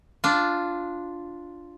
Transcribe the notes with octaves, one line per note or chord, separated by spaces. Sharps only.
D4 F4